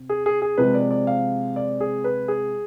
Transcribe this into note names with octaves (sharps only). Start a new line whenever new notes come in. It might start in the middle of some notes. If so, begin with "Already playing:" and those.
Already playing: C3
G#4
G#4
G#4
C3 F3 G#3 B4
D5
D5
F5
D5
G#4
B4
G#4